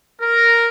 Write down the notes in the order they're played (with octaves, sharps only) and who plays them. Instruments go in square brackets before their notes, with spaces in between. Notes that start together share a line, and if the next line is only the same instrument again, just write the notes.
[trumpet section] A#4